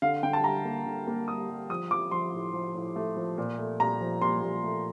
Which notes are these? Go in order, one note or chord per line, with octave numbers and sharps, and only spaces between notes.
D3 F5
D3 G5
A5
G3 A#5
A#3
D3
A#3
G3 D#6
G3
F3 D#6
F3 D6
F3 C6
A2
F3
A2
A3
F3
A#2
A3
A#2 A#5
F3
A#2 C6
A#2
A3